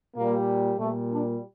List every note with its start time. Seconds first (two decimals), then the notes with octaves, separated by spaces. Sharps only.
0.17 A#2 G3 A#3
0.79 A#2 G3 A3
1.11 D4